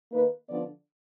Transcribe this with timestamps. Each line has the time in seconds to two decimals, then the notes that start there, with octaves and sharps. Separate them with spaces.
0.12 D#3 A#3 D#4 B4
0.49 D3 F3 B3 D4 D5